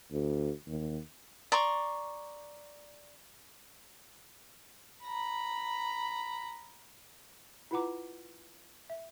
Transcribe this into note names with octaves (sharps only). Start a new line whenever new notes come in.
D2
D#2
D5 A#5 C6 C#6
A#5 B5
E4 F4 B4 F#5 A#5 D6
E5